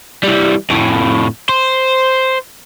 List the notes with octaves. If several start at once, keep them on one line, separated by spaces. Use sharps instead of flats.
E3 G3
F2 A2
C5